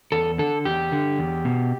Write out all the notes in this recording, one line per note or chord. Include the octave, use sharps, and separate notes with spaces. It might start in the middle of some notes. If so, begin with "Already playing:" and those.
E2 A4
D3 A4
E2 G4
D3
E2
B2